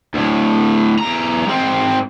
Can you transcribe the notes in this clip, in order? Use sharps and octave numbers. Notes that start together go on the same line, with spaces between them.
D2 A2
E2 A#5
G#2 C4